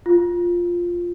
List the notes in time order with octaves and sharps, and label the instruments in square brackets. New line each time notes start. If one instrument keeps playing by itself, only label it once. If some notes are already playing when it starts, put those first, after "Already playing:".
[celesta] F4